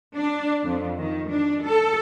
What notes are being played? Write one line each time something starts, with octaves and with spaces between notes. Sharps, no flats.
D4
F2
D#3
D4
A4